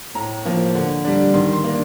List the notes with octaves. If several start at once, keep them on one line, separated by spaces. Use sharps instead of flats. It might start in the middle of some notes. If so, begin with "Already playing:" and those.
A2 A#5
F3 A#3
D3
G3 D4
D#3 C6
C6
A#3 D4